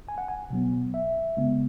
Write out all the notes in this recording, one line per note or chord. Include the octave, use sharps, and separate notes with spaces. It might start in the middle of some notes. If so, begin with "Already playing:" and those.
G#5
F#5
G#5
B2 F#3 B3
E5
C#3 G#3 B3